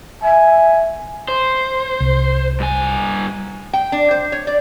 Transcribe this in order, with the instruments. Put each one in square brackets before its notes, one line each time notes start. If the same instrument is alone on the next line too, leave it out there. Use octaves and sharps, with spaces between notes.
[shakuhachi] E5 [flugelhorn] G#5
[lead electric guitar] C5
[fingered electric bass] C2
[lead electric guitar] G2 G#5
[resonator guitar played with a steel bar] G5
D4
C5
C#5
D5